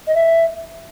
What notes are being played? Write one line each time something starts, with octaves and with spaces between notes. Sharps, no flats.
D#5
E5